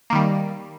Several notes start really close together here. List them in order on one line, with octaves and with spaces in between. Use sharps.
A#3 D#3 G3